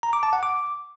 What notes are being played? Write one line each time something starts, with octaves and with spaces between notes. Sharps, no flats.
A#5
D6
A5
F#5
D6